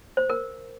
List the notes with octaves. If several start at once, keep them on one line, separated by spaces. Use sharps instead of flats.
C5
A#4